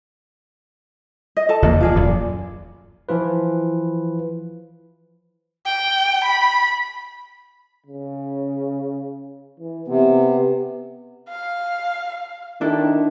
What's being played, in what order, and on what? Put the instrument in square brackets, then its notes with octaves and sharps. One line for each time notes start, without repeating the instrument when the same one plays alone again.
[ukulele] D#5
A4 D#5 A5
[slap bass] F1 E2 A#3
[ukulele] F4 G#4 D5
[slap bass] D1 F#2
[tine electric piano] E3 F3 F4 B4
[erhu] G5
B5
[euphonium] C#3
E3
[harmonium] C3 [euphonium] B3
[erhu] F5
[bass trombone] D#3 [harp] D4 E4 A4